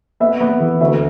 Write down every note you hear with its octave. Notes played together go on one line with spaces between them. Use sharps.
B3 E5
B3
E3
D2 E5